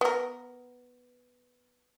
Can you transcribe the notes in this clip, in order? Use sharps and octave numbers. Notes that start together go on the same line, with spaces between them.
B3 A#4